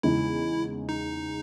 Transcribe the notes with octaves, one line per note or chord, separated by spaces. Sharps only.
E2 C#3 G#3 D#4 E4
D#4